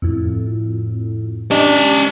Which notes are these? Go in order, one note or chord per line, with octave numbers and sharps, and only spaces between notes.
F2 A2
C#4 D4 G4 D5 D#5